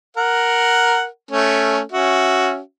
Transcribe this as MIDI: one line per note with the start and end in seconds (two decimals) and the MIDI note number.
0.17 1.06 70
0.17 1.06 78
1.31 1.81 57
1.31 1.81 61
1.92 2.59 61
1.92 2.59 66
1.92 2.59 76